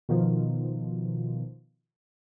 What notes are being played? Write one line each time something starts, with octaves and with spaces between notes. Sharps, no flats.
B2 D#3 F3